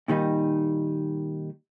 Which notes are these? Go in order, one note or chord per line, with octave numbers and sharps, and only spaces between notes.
A#2 D#3 G3 D#4